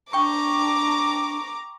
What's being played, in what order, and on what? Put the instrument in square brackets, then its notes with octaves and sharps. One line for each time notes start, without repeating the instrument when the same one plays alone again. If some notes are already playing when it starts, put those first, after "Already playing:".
[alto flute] D4 [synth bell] G5 C#6 [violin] A#5 D6